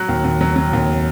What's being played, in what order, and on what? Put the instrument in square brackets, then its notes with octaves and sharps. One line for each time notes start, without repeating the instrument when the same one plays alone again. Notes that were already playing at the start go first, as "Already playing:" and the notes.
Already playing: [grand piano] F#3 F#6
D#2
D#2
F#3
F#3
D#2